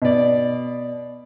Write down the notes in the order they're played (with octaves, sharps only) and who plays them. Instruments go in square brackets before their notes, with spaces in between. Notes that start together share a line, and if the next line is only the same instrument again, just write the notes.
[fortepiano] B2 D5